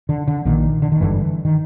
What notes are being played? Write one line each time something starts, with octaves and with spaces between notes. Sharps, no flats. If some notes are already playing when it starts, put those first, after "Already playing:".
D3
D3
A#1 A#2 D#3
D3
D#3
G#1 G2 D3 E3
D#3